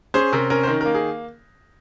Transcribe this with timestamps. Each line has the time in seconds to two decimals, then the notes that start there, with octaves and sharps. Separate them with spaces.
0.14 C#4 G#4 C5
0.33 C3 A#4
0.50 C#4 A#4
0.63 C5
0.67 D#3 A#4
0.81 A#3 A#4
0.95 G#4